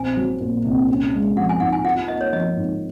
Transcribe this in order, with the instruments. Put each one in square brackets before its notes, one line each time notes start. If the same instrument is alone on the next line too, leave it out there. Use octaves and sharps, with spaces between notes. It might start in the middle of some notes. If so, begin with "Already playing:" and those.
Already playing: [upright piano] A#1 C4 [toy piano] G#5
[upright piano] F#3
A#2
C2
C#4
G#3
[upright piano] F3 [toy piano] F#5
[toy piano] G#5
[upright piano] G#2 [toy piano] F#5
[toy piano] G#5
[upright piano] F4 [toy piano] F#5
[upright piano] A#3 [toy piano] D#5
[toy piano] C#5
[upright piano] F3 [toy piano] D#5
[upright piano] G#2